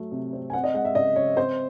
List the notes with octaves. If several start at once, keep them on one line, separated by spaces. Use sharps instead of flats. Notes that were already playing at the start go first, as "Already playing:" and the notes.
Already playing: F#3 A3
C3
C4
G#5
C4 F#5
D#5
G#3 F#5
E5
C#3 D#5
C#3 C#5
C4 C5